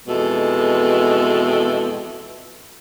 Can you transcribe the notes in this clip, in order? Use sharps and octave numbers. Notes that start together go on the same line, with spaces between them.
F2 B2 E3 G#3 A4